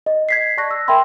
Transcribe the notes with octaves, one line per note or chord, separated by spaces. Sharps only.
D#5
G#6 B6 C7
D5 A5 C#6 F#6 A#6
E6
A#4 E5 G5 B5 C6